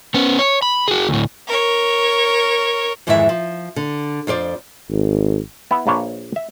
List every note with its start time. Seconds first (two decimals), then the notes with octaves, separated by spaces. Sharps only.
0.14 B3 C#4
0.39 C#5
0.62 B5
0.88 F#4 G#4
1.09 D2 A2
1.47 A#4 C#5
3.07 F2 G#2 D#3 E3 E4 E5
3.29 F3
3.76 D3
4.27 F2 F4 C5 D5
4.90 G#1
5.71 B3 E4
5.87 A#1 A#3 B4 C#5 A5
6.36 E5